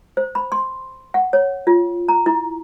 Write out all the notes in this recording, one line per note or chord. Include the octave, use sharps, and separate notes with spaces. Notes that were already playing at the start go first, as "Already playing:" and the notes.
C5
B5
C6
F#5
C#5
F4
A#5
E4